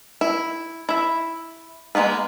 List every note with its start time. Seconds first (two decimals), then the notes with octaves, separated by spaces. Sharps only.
0.21 E4
0.89 E4 E5
1.95 G#3 A#3 B3 B4